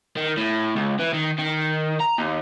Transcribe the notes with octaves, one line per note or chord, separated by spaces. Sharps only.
D#3
A2
C#2
E3
D#3
D#3
A#5
D#2